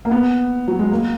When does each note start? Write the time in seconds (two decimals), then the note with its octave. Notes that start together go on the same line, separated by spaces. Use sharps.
0.05 A#3
0.11 B3
0.68 F#3
0.79 G#3
0.92 A#3